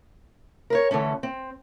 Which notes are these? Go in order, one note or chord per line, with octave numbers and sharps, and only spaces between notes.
A#4 B4 C#5
D3 E3 A3 C#4
C4